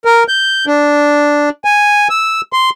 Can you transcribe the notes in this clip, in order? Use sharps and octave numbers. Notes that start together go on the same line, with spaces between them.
A#4
G6
D4
G#5
E6
C6